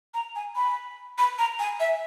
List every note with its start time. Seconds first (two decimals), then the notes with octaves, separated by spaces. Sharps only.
0.14 A#5
0.36 G#5
0.56 B5
1.18 B5
1.39 A#5
1.59 G#5
1.80 E5